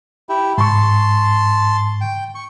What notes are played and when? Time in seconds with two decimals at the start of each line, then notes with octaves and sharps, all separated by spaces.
0.29 E4 G4
0.58 G#2 A5 C6 C#6
2.01 G5
2.35 C#6